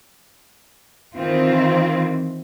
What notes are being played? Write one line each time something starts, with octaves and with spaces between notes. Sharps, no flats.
D#3 E3 C4 F4